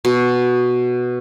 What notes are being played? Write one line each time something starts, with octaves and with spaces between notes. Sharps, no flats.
B2